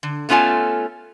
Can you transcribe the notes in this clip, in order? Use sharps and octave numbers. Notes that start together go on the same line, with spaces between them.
D3
A3 B3 C#4 F4 A4 G#5